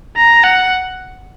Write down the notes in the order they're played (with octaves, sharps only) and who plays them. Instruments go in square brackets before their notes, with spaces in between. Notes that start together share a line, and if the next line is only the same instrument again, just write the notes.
[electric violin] A#5
F#5